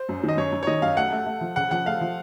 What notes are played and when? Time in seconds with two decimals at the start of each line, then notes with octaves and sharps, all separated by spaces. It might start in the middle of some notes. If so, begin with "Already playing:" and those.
Already playing: C5
0.09 F#2
0.23 D#3
0.29 D#5
0.37 F#2 C#5
0.52 F#2
0.63 C#5
0.67 D#3 D#5
0.82 F#2 F5
0.97 A3 F#5
1.12 A3
1.26 A3
1.41 F3
1.56 C#3 F#5
1.71 F3 F#5
1.86 A3 F5
2.01 F3